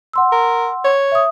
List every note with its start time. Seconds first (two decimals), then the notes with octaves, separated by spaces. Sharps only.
0.13 F#5 C6 E6
0.32 A#4
0.85 C#5
1.12 E5 D#6